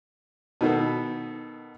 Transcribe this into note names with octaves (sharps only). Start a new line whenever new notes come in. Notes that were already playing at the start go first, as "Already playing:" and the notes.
B2 D#3 B3 A4